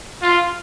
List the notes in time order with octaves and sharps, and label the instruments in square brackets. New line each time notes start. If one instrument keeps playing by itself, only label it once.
[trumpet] F4